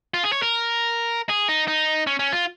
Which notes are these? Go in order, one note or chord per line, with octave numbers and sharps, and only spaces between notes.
F4
G#4
C#5
A#4
G#4
D#4
D#4
C#4
C#4
F4